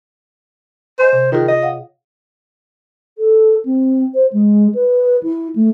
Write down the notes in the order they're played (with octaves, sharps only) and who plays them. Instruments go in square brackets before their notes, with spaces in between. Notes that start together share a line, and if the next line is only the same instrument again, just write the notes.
[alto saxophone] C5 [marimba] D#5 G#5 C6
[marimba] C3
[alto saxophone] D#3 [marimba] F4 G#4
[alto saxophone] D#5
[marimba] C#5 F5 F#5
[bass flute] A4
C4
C5
G#3
B4
E4
A3